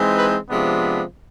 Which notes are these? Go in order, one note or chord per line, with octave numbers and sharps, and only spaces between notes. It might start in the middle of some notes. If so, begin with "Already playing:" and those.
Already playing: E3 G#3 C4 D#4
B4
C3 F3 G#3 B3 D4